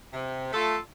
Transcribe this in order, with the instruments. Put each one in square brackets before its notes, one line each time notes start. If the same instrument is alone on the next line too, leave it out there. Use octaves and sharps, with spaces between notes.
[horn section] C3
A3 F4 A4